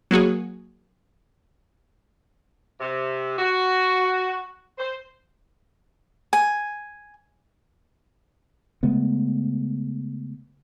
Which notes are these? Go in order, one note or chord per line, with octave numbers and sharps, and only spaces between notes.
F#3 A#3 F#4 G#4
C3
F#4
C5
G#5
C#3 G#3 A3 B3